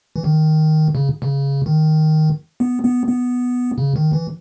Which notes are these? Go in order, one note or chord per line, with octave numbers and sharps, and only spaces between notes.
E3
D#3
C#3
C#3
D#3
B3
B3
B3
C#3
D#3
E3